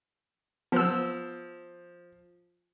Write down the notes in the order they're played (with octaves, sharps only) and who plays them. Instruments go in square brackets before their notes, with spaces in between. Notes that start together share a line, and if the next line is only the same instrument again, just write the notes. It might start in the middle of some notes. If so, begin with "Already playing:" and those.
[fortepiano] F3 [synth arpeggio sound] B3 E6